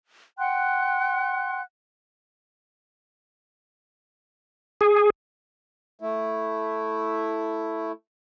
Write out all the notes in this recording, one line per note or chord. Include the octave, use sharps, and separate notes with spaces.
F#5 G5 C6 F#6
G#4
A3 E4